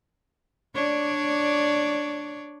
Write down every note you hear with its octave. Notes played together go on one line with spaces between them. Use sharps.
D4 C#5 D5